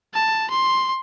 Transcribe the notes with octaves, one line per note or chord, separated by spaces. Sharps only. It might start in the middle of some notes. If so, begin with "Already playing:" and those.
A5
C6